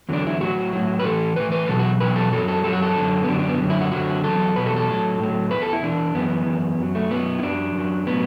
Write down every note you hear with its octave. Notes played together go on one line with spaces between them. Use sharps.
E2 D3 F#3 D4
E4
A2 F#3 F#4
A2 F#3
B4
A2 E3 A4
A2 E3 B4
B4
E2 B2 F#3 A4
F#4
E2 B2 F#3 B4
A4
F#2 F#3 A4
A4
F#2 F#3 A4
F#4
A4
F#2 D3 F#3
B3
F#2 D3 F#3 D4
D4
B3
F#2 D3 F#3
E4
F#4
F#2 D3 F#3 F#4
E2 B2 F#3 A4
E2 B2 F#3 B4
A4
A4
A2 F#3
A2 F#3
E2 E3 B4
A4
E4
E2 E3 D4
F#2 E3 B3
F#2 E3
F#2 F#3
A3
F#2 F#3 B3
E4
F#2 F#3 D4
F#2 F#3
A2 F#3 B3